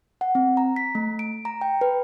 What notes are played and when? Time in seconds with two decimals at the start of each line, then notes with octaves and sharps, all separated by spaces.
0.21 F#5
0.35 C4
0.57 A#5
0.76 B6
0.95 A3
1.19 D7
1.45 A#5
1.61 G5
1.81 B4